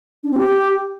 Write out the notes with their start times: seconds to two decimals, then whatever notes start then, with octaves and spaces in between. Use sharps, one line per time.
0.23 D4
0.31 C4
0.38 G4